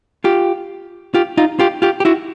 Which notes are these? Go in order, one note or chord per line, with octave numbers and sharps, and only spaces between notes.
F4 G4
F4 G4
D#4 F4
F4 G4
F4 G4
G4
E4 F#4